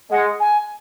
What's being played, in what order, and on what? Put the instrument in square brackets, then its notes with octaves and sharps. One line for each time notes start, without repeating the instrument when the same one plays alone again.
[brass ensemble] G#3 [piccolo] F#5
[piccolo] G#5